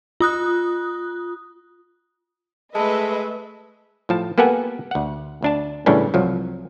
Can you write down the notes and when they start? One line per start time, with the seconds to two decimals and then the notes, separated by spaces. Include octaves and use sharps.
0.20 F4 D#6 F#6
2.75 G#3 A3 A4 B4 D#5 E5
4.09 A2 F3 A5
4.38 A#3 B3 G4 A4 F#5 G#5
4.91 D2 F#5
5.42 D2 D4 A5
5.86 A2 C#3 E3 G3 C#4 D4
6.14 C2 F3 F#3